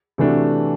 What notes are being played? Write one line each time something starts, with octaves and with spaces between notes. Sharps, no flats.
C3 E3 A3 D4 F#4